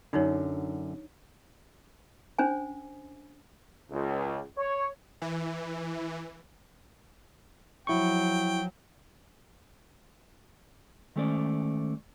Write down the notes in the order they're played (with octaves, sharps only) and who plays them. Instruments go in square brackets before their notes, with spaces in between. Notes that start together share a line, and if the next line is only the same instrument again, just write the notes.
[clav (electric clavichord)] F#2 D3 [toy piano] D4 D#4 C#5
[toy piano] C#4 D4 C5 G#5
[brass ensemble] C#2
C#5
[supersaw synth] E3
[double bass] F3 F#3 [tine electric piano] E4 C#6 [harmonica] G5
[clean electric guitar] D#3 G#3 A3 C#4 C5 D5